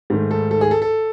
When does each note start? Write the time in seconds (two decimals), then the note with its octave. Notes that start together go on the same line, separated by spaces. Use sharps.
0.10 G#2 D#3 A3
0.31 A4
0.51 A4
0.61 G#4
0.71 A4
0.82 A4